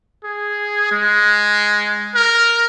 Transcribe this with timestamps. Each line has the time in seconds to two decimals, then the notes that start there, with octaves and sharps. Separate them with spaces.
0.24 G#4
0.92 G#3
2.15 A#4